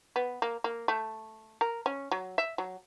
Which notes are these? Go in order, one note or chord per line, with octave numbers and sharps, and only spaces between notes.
B3
A#3
A#3
A3
A#4
C#4
F#3
E5
F#3